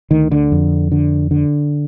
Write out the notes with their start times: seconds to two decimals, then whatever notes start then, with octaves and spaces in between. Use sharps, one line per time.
0.11 D2 D#3
0.32 D3
0.52 F2
0.92 D3
1.31 D3